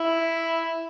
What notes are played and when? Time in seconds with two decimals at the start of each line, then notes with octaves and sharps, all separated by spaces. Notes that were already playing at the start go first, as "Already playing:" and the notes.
Already playing: E4